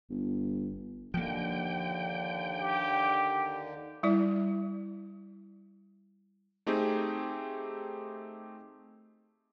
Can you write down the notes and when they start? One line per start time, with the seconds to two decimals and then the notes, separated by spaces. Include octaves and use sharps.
0.10 G1
1.14 D#2 D3 F3 A#3 G5
2.60 G4
4.03 G3 E4 D5
6.67 A3 C4 D#4 G4 G#4